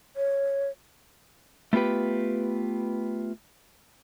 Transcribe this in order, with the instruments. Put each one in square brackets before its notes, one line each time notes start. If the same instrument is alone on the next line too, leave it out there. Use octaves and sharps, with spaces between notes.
[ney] C#5
[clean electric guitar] A3 B3 F4 G4 B4